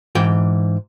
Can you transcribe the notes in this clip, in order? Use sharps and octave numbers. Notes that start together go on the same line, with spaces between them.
G#2 E3 G5